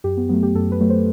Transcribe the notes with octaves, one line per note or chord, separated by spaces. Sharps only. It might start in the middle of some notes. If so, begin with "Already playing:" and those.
F#2 G4
B3
F#3 A3 B3
G4
F#2 A4
B4
F#3 A3
C5